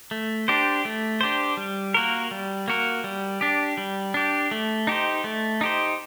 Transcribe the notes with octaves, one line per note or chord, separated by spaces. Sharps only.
A3
D4 G4 C5
A3
D4 G4 C5
G3
A#3 F#4 A#4
G3
A#3 F#4 A#4
G3
D4 G4
G3
D4 G4
A3
D#4 G4 C5
A3
D#4 G4 C5